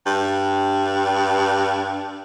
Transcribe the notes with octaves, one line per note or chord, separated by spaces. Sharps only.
G2